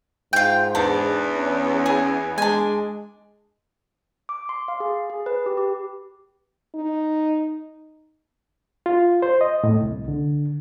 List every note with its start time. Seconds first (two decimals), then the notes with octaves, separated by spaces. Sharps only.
0.33 G#2 F4 G5
0.75 E2 D4
1.37 C#4
1.86 G#4
2.38 G#3 D4 G#5
4.29 D6
4.49 C6
4.68 F5
4.80 G#4
5.10 G#4
5.26 B4
5.46 G4
5.57 G4
6.75 D#4
8.86 F4
9.22 C5
9.41 D#5
9.64 A2
9.83 C2
10.08 D3